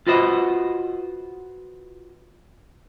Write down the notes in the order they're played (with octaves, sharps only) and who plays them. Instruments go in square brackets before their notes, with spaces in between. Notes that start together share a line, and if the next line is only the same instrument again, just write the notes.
[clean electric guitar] F4 F#4 B4 C5 D#5